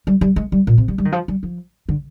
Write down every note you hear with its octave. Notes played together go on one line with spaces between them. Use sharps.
G3
G3
G#3
G3
A#2
C3
G3
G3
D#3
F3
G3
F3
D3